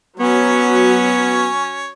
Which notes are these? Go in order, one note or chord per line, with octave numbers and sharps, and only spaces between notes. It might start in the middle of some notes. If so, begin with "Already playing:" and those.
F#3 B3 C#4 C#5